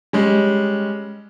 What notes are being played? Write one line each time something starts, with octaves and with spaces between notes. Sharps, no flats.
G3 G#3 C#4